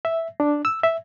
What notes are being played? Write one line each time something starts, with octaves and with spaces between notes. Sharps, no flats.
E5
D4
E6
E5